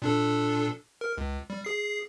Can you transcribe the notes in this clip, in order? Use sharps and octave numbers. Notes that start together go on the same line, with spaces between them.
A#2 D4 A4
A#4
C#2
G3
G#4 C7